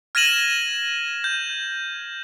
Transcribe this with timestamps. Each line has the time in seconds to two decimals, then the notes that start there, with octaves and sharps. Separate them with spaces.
0.15 F6 G#6 A#6 D#7 E7 F#7
1.24 G6